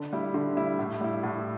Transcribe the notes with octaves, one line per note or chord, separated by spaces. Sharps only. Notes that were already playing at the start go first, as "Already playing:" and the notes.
Already playing: D3
G3 E4
D3
G3 E4
A2
G3 E4
A2